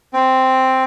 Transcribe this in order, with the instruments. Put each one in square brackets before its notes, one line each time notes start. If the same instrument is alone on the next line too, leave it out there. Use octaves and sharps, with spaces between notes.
[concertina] C4